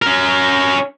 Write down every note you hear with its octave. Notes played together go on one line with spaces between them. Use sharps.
C#4 A#4